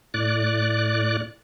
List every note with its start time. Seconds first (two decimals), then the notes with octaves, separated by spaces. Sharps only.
0.14 A2 D5 F#6